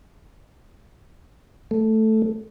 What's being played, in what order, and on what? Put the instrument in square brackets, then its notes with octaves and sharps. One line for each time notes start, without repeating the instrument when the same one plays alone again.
[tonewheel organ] A3